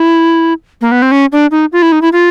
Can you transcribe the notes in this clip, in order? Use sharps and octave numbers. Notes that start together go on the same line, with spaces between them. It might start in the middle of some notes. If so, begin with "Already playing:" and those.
Already playing: E4
A#3
B3
C4
C#4
D4
D#4
F4
E4
D#4
E4
F4